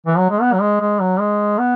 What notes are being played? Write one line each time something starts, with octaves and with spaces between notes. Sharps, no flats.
E3
F#3
G#3
B3
F#3
G#3
G#3
F#3
G#3
B3